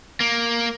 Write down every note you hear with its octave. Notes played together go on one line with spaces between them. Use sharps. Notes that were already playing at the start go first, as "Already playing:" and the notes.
A#3